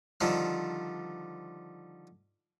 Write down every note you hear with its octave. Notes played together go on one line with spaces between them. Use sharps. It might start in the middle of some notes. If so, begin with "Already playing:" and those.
D3 D#3 F3 G3 C4